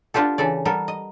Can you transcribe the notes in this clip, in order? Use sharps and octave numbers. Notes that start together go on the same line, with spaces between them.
B3 D4 F4 G4 A4
C#3 E3 A4 D5
G3 B3 A4 A#4
D#5